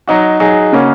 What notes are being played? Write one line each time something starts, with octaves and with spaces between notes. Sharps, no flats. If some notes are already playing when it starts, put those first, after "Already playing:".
F#3 D#4 F#4
F#3 D#4 G#4
C#3 A#3 C#4 F#4